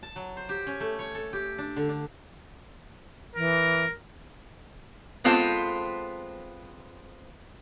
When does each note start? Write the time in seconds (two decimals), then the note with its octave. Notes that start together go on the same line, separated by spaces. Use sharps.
0.03 A5
0.16 F#3
0.37 C5
0.49 G4
0.67 C#4
0.80 A3
0.99 C#5
1.15 A4
1.33 G4
1.58 D4
1.76 D3
1.89 D4
3.35 E3 A#4
5.24 G#3 B3 C4 F4 A4 C5